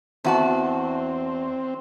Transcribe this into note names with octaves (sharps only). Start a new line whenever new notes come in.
E2 C4 F#4 A5